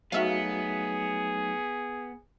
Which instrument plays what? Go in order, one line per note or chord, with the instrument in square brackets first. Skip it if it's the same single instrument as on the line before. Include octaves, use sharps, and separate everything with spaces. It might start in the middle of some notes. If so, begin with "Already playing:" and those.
[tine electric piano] F#3 A3 D#4 [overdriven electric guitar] B3 [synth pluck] F#4 E5 F5 [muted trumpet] G#4